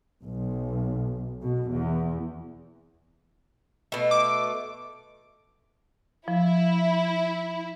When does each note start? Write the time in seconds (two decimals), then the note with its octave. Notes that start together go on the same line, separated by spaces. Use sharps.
0.21 B1
1.41 B2
1.71 E2
3.92 B2 A3
4.11 D6
6.28 F3 E4